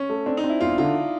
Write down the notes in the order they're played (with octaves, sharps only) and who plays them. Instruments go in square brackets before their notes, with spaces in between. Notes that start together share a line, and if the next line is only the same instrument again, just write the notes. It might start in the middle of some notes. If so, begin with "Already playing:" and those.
Already playing: [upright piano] C#4
[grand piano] A3
[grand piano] C4 [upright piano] D4
[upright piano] D#4
[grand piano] C4
[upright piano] E4
[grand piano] E1 [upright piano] F4
[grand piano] D3 [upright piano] F4